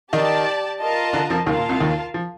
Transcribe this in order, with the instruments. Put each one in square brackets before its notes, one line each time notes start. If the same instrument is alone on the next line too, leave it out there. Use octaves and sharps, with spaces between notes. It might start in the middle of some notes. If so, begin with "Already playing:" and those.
[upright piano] D#3 D#4 [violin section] G4 D5 A5
[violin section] F4 A#4 D#5 A5
[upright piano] D3 D4
F2 F3
[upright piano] D#2 D#3 [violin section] F4 A#4 F5 A5
[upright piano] A#2
C2 C3
D#2 D#3
F3